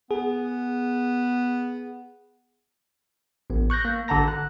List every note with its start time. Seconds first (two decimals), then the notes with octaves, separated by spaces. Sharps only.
0.11 B3 G#4
3.50 A1 B3
3.70 C#6 F#6 G6 A#6
3.85 A#3
4.08 G#1 D3 F#5 A5 A#5 A#6
4.28 F#6